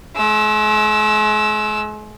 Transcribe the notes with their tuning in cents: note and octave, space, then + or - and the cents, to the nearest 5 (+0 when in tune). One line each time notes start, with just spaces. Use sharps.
G#3 +40 E6 +0